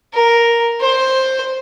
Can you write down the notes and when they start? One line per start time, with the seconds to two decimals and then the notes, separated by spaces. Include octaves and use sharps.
0.13 A#4
0.80 C5